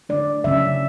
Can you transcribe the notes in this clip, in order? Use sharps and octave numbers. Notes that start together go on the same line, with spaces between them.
D3 A3 D4 D5
C#3 F#3 C#4 E5